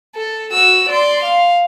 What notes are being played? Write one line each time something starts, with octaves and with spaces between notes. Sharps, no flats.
A4
F#4 E6
D5 C6
F5